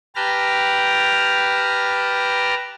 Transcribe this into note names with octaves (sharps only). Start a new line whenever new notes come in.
G4 B4 G5 A5 A#5 F6